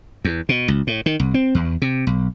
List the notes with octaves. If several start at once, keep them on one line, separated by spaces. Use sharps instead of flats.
E2
B2
C#2
A2
D#3
C2
C4
E2
C3
B1